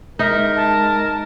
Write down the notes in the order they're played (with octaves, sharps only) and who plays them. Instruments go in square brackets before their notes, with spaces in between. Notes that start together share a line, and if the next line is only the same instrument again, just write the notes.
[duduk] G#3 [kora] D#4 [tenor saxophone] A#4 [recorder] E5
[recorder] A5